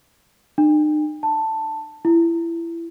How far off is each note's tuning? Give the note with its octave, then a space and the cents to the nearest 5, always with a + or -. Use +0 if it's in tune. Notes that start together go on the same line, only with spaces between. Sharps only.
D#4 -45
A5 +10
E4 +25